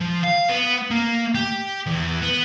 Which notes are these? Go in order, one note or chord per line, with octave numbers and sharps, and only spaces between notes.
F3
F5
B3
A#3
G4
E2
B3